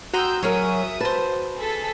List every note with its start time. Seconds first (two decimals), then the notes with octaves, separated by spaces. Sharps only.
0.14 F#4 G5 A#5 C6 D#6 E6 G6
0.42 F#3 C#4 G#4 A#4 C#5 E5 D#6
1.00 B4 C5 A5
1.57 G#4 A4 B6